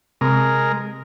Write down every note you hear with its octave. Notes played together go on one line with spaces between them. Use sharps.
C3 G#3 A#4